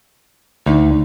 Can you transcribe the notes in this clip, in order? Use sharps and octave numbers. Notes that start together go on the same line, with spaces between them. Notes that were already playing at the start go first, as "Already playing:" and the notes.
D2 D#4